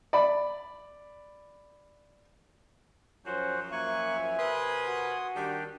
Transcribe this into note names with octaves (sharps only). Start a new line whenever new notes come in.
D5 B5
F#2 F3 C#4 F#4 C5
A#3 E5 G#5 C#6 F#6
C3 A#4 B4 C6 D#6
F#4
D#3 G3 D4 G4